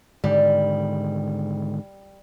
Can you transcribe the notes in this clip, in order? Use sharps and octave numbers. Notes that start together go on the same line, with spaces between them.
G#2 D3 D#3 G3